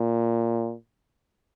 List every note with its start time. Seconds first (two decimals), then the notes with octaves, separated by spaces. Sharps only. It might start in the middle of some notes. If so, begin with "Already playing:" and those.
Already playing: A#2